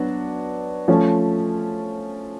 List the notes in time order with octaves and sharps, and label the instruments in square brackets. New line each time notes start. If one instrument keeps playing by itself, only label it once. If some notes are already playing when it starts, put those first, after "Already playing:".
Already playing: [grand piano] F#3 B3 D4 F#4
F3 A3 C#4